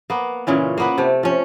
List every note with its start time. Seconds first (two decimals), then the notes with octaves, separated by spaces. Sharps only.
0.10 A#3 B3
0.47 A#2 C#3 E3 C#4
0.78 A#3 B3 B4
0.98 C3 A3
1.23 F3 C#4